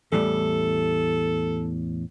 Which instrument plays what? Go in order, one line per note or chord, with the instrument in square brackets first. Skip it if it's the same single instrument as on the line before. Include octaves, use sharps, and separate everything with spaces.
[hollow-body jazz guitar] E2 A2 G3 [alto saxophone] A4